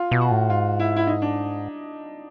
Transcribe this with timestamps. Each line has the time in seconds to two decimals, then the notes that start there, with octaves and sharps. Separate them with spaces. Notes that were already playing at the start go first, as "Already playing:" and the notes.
Already playing: F4
0.11 B2
0.21 F#4
0.31 A2
0.50 G#2 F4
0.79 E4
0.96 E4
1.07 D#4
1.22 D4